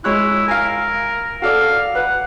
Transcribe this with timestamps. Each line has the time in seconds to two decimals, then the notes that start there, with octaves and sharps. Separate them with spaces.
0.04 G#3 E4 C#5 F#6
0.48 A#4 F5 G#5
1.42 F#4 A4 D5 F5
1.95 B4 F#5